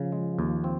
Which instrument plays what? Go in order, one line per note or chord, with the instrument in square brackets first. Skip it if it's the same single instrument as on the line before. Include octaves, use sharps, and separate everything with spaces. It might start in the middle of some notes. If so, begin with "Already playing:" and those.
Already playing: [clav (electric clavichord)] C#3 [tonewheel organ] F3
[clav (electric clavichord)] G#3
D#2
C4